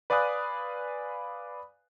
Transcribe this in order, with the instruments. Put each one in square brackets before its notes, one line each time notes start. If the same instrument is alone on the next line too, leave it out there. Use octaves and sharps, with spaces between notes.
[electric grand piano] B4 D5 F5 G#5 D#6 F#6